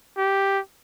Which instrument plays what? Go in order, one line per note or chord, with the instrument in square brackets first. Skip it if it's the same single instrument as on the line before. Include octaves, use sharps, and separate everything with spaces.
[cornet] G4